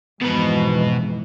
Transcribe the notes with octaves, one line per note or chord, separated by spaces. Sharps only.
F2 G#2 B2 E3 B4